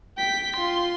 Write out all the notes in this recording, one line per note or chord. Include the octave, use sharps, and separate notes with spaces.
G5 B6
F4 C6